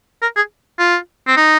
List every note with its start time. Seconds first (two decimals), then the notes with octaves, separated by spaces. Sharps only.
0.22 A#4
0.36 G#4
0.79 F4
1.27 C4
1.37 D#4